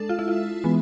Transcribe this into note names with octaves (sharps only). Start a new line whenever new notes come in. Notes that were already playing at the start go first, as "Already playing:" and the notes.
Already playing: G#3 D4 A4
F4
E4
F4
E3 G#3 B3